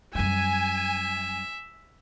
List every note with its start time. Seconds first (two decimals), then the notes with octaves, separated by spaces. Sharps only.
0.15 F#2 G3 E5 G#5